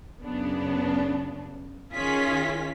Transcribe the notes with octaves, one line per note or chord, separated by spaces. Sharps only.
F#2 C#3 B3 D4
D#3 C#4 F4 G#4 B6